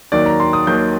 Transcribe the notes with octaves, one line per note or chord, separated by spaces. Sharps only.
D#2 D#3 F#3 D5
A#5
C6
D#6
D#2 D#3 F#3 G6